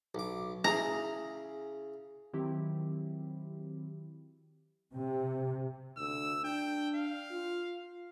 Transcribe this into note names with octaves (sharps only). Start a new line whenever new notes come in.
B1 D6
C#3 E4 G#4 A#5
D#3 F#3 C4 E4 G4
C3
D2 E6
D4 G5
F5
F4